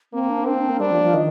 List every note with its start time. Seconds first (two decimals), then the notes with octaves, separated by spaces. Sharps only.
0.13 A#3 C4
0.30 D4
0.46 C4 D4
0.58 D4
0.69 A#3
0.80 G3 D4
0.91 F3
1.02 F3
1.14 D#3